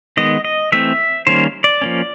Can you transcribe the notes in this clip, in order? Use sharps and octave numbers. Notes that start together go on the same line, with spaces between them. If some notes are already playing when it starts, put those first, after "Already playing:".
D#3 G#3 B3 D#5
D#5
E3 A3 C4 E5
D#3 G3 A#3 C#4 C5
D5
F3 A#3 C#4